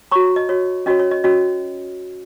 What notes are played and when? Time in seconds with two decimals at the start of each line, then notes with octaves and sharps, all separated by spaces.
0.11 F#4 C#5 A#5 C#6
0.36 D#5
0.49 F#4 C#5
0.86 C#4 F#4 C#5 D#5
1.00 C#5
1.11 D#5
1.24 C#4 F#4 C#5 D#5